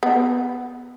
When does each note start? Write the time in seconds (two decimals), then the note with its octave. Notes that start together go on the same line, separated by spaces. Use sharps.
0.03 B3